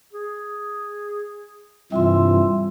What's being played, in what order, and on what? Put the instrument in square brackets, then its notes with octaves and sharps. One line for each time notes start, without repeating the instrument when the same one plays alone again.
[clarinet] G#4
[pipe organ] G2 C3 E3 [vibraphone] G3 F4 C6 [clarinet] E5